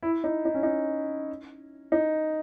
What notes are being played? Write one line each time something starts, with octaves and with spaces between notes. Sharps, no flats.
E4
D#4
D#4
C#4
D#4
D#4